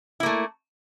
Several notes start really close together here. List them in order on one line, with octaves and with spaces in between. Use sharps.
E4 A#3 A3